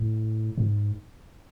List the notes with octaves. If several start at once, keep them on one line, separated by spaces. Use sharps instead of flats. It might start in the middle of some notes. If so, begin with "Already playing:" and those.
Already playing: A2
G#2